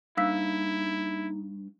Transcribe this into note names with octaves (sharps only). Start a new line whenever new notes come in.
G2 A#3 D#4 E4 F5 E6 B6